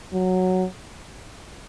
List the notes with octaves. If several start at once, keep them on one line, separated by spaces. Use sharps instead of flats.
F#3